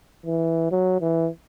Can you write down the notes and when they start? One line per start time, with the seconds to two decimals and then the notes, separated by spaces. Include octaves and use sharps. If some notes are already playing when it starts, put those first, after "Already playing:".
0.26 E3
0.72 F#3
1.01 E3